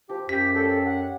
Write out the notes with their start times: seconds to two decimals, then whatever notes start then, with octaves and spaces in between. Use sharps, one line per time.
0.09 F3 G4
0.29 F#2 G4 B6
0.54 G4 A4 C#5 D5
0.85 F#5